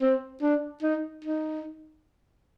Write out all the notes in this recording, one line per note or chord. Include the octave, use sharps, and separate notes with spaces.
C4
D4
D#4
D#4